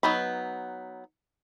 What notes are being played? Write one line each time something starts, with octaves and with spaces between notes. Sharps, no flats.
F#3 B3 D#4 B5